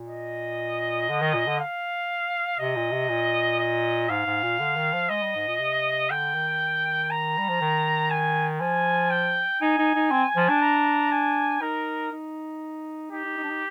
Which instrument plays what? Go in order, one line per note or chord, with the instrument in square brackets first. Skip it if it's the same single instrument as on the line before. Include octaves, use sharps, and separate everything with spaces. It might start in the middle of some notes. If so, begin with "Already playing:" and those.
Already playing: [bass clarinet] A#2
[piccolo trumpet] D#5
[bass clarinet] D3
D#3
A#2
D3
[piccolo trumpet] F5
[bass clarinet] C3 [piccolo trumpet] D#5
[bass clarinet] A#2
C3
A#2
[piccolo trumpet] D#5
[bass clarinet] G#2 [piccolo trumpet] F5
[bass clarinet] G#2
A#2
D3
D#3
F3
[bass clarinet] G#3 [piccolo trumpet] D#5
[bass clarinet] G3
G#2
A#2
C3
[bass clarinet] D3 [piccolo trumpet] G5
[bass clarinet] D#3
[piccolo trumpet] A#5
[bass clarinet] G3
F3
D#3
[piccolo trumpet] G#5
[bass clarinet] F3 [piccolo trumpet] G#5
[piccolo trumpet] G5
[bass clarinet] D#4 [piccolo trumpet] G#5
[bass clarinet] D#4
D#4
C4
F3
D4
[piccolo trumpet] A#5
G#5
[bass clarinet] D#4 [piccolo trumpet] A#4
[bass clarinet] D#4
[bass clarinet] D#4 [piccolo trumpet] G4
[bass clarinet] D#4
D#4
D4
D#4